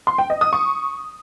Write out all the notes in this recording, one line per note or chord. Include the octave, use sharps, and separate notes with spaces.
C6
G5
D#5
D#6
C#6